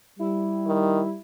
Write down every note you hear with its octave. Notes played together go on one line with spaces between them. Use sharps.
G3 E4
D#3